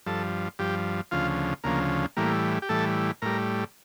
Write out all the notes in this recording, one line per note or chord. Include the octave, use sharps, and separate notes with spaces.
G2 F3 A4
G2 F3 G4
D2 C#3 F3 F4
D2 C#3 F3 A#3
A2 E3 G3 A#3
G4
A2 E3 G3 A4
A2 G3 A#4